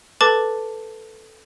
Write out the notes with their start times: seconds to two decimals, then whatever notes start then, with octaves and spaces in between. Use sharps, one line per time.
0.21 A4 B4 A5 D6 A6